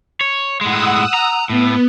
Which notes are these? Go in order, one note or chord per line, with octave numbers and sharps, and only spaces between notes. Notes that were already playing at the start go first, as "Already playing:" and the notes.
C#5
A2 G#3 F#5 D#6 E6
A#5
A2 B3